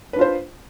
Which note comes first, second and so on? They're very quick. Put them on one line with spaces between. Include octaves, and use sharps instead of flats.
B4 D4 F4 C5